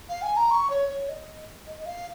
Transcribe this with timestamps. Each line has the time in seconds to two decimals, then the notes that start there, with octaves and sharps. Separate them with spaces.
0.09 F5
0.22 G#5
0.36 A#5
0.50 C#6
0.69 C#5
0.89 C#5
1.08 D#5
1.66 D#5
1.79 D#5
1.85 F5